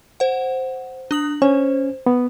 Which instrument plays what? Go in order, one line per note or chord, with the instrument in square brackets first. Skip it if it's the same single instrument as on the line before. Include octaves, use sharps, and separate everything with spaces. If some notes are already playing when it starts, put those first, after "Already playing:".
[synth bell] C5 F#5
D4 D#6 F#7
[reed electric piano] C#4 [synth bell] C5
[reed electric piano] B3